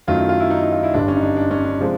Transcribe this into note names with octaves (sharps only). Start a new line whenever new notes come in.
F#2 D#3 F#3 A3 F4
E4
F4
E4
D#4
D#4
F4
E4
G1 G2 D3 G3 D4
C#4
D#4
D4
D4
C#4
D4
C3 F3 G#3